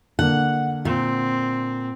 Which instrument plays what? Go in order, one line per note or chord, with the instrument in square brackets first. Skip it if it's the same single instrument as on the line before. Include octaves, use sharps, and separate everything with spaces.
[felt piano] D3 A#3 [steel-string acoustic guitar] F#5
[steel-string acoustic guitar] A#2 [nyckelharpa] C4